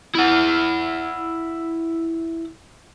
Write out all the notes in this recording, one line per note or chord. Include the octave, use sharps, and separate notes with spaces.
E4 F#5